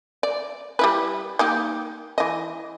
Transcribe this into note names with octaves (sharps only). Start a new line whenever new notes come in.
D5
G3 E4 B4
A#3 D#4 G4
E3 D#5